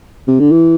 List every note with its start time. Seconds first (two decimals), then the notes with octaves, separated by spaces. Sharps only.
0.27 C3
0.40 D3
0.51 E3